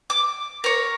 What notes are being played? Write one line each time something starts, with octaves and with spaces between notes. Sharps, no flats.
D6
A#4 C#5